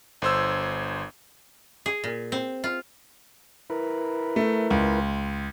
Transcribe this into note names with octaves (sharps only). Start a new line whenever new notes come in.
G1 C5 E6
G#4
A#2
C4
F4
E4 A#4 B4
A3
C#2